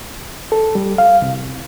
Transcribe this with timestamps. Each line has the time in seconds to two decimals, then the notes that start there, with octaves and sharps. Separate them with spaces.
0.52 A4
0.75 G3
0.98 F5
1.22 C2